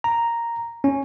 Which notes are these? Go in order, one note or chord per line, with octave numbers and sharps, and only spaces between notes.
A#5
C#4